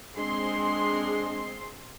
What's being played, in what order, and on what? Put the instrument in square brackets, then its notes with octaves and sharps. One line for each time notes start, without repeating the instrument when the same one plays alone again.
[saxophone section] G#3 D4 [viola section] C4 G#4 C6